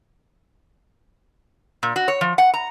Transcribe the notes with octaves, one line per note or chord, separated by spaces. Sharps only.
A#2
F#4
C#5
F3
F#5
A#5